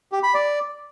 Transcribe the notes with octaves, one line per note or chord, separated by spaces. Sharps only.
G4
B5
D5